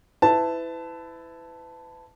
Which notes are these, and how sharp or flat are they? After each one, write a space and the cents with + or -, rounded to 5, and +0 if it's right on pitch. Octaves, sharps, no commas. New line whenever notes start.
E4 +0 B4 +30 A5 +0